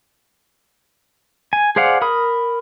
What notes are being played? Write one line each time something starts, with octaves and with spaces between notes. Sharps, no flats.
G#5
G#4 C5 D5 F5 F#5
A#4 B5 D#6